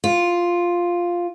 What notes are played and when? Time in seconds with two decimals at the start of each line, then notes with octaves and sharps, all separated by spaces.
0.04 F4